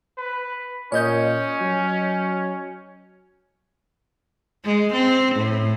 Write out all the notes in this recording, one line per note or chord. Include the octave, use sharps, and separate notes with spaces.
B4
A#2 C#4 C#5 D#5 G6
F#3
G#3
C4
A2